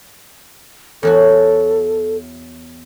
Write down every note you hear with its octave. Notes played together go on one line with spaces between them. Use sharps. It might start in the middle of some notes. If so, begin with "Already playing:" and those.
E2 F#3 F#4 A4